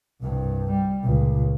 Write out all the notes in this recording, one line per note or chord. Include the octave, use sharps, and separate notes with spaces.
C2 G2
G3
C#2 A#2